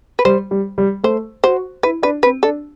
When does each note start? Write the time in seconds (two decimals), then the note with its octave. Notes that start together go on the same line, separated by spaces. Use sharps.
0.19 B4
0.25 G3 C5
0.51 G3
0.78 G3
1.04 A3 C5
1.44 F#4 C5
1.83 E4 B4
2.03 D4 B4
2.23 C4 B4
2.43 D4 A4